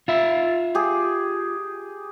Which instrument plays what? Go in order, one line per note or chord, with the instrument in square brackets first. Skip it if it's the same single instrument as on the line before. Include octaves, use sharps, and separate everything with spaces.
[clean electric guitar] F4 E5
[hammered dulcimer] G4 G#4